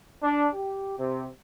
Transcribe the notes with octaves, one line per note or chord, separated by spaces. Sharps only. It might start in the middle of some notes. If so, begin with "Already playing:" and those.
D4
G4
C3